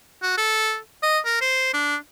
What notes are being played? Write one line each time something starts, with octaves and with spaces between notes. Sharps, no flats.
F#4
A4
D#5
A#4
C5
D4